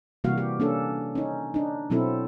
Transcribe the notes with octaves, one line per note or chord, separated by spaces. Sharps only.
C3 E3 G3 A#3 F#4 F5
G4
A#3 C#4 D4 A4
C#4 D#4
D4 D#4
B2 F#3 C4 E4 A4